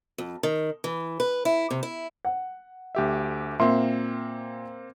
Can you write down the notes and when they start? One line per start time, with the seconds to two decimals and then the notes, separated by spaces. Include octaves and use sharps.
0.18 F2
0.43 D#3
0.84 E3
1.20 B4
1.45 E4
1.70 C3
1.83 E4
2.25 F#5
2.95 D2 G4 E5
3.60 A#2 A#3 C4 E5 C6